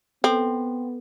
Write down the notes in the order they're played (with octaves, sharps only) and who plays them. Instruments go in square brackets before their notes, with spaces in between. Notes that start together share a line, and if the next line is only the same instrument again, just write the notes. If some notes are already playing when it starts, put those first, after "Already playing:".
[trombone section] B3 [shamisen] C4 [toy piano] A4